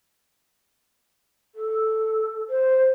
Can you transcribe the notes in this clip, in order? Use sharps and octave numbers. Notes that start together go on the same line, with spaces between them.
A4
C5